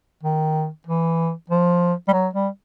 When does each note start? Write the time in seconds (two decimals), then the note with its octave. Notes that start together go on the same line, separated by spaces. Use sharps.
0.23 D#3
0.87 E3
1.50 F3
2.08 G3
2.13 F#3
2.33 G3